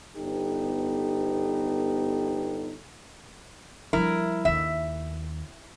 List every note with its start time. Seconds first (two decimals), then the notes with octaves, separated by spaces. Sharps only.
0.17 G1 B3 D#4 G4 A4
3.93 F3 G3 E4 A#4
4.45 D#2 D#3 E5